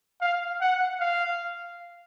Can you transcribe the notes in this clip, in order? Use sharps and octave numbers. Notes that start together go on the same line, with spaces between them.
F5
F#5
F5